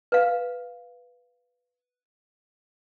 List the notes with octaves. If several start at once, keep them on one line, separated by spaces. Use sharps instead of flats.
B4 F5